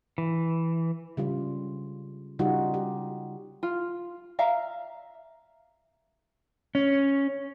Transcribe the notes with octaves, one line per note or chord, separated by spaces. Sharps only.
E3
C#3 G3 F4
C#3 G3 D#4 F4 F#4
G4
F4
E5 F5 A#5
C#4